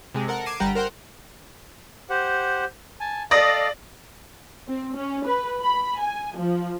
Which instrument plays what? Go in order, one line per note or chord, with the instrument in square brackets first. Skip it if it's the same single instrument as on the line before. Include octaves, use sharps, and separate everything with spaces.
[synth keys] C3 G#3
A4 A#4 F#5
D6 G#6 C7 D#7 E7
G1 G3 G4 F#5 A#5 D7
A#4 C5 F#5 G5 C6
[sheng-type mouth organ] G4 C5 F#5
G#5 A5
[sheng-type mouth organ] A4 D#5 F5 [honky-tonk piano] D5 D#6 A#6
[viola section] C4
C#4
B4
B5
G#5
F3